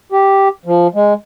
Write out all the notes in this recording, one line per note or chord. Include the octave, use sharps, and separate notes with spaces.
G4
F3
G#3